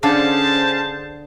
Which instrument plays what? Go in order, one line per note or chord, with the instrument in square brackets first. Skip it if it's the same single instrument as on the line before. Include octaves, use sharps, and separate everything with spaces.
[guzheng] D3 A4 F5 [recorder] C#4 [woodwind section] G#4 C5 [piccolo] A5